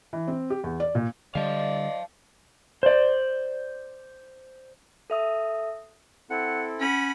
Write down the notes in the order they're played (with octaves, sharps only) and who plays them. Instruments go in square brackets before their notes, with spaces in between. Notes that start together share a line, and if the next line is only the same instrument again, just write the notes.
[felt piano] E3
C4
G4
E2
D5
A#2
[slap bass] D3 G3 [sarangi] D5 [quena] D#5 [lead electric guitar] F5 A5
[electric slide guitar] C5 D5
[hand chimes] A4 E5 D#6
[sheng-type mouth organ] C4 E4 A4 [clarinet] F#5
[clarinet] C#4 [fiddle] F#5 B5